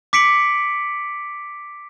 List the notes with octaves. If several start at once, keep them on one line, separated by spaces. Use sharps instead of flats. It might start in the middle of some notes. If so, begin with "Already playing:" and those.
D6 B6 C#7 D7 F#7